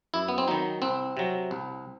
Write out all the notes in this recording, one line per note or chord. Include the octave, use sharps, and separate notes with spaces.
F#2 E4
B3
C4
D#3 F#3 D#4
C2 C4
C3 F#3
C2